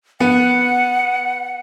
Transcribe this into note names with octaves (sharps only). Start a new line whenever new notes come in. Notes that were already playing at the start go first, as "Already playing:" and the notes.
B3 F#5